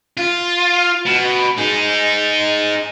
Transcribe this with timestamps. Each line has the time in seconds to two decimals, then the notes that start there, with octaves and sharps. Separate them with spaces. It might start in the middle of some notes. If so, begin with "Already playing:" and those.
0.17 F4
1.05 B2
1.58 D#4 G#4